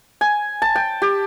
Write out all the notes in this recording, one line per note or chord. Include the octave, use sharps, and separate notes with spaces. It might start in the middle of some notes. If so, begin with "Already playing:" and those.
G#5
A5
G5
G4